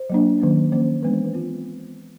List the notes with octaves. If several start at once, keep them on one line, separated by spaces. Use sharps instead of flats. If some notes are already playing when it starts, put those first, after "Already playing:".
Already playing: C5
F#3 A#3 D4
D#3 F#3 A#3 C#4
F3 A#3 C#4 C5
E3 G#3 B3 D4 B4
C5
B4
C4 F4